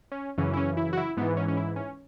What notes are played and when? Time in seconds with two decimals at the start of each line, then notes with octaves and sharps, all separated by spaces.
0.12 C#4
0.38 F#2 C#3 E3 C#4
0.53 E4
0.57 C#4
0.77 E4
0.93 F#4
0.97 E4
1.17 G#2 E3 B3
1.37 C#4
1.48 C#4
1.57 E4
1.76 C#4